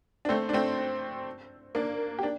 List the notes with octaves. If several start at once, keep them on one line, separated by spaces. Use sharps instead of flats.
D4
A3 C4
D4
A3 C4
A#3 D4
G4
D4